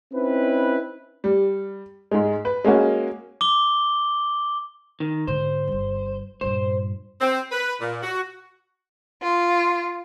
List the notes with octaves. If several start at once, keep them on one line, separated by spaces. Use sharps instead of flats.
C4 C#4 D#4 E4 B4
G3
G#2 G#3
B4
G#3 A#3 C#4 F#4
D6 G7
D#3
G#2 D3 C5
G1 G3
G2 A#2 C5
C4
B4
A#2
F#4
F4